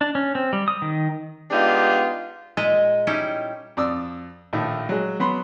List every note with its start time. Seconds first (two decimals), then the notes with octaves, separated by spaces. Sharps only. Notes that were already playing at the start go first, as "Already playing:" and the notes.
0.01 D4
0.15 C#4
0.35 C4
0.53 G3
0.68 D#6
0.82 D#3
1.51 G#3 B3 D4 D#4 F4 G4
2.57 A#2 G#3 D#5 E5 A#5
3.07 G3 C#4 D#4 E4 G4
3.77 F2 D5 D#6 E6
4.53 A#1 A2 D#3 E5
4.89 F#3 G#3
5.20 F#3 B3 B5 C6